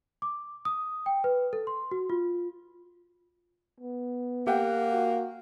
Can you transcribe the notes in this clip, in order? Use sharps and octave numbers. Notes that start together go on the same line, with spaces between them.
D6
D#6
G5
B4
A4
C6
F#4
F4
B3
A#3 G4 F#5 G5
F#4